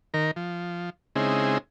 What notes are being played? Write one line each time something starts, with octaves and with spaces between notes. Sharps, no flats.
D#3 A#4
F3
C#3 G#3 C4 D#4 E4 G#4